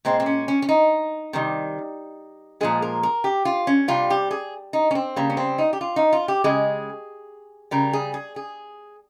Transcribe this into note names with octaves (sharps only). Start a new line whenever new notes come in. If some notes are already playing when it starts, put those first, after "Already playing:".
A#2 G#3 C4
C4
C#4
C#4
C#4
D#4
C3 D#3 G3
A#2 F3 G#3 G#4
A#4
A#4
G4
F4
C#4
C3 G3 F4
G4
G#4
D#4
C#4
C4
C#3 G3 A#3
C#4
C4
D#4
G4
F4
D#4
F4
G4
C#3 G#3 G#4
C#3 G3 A#4
G#4
G#4
G#4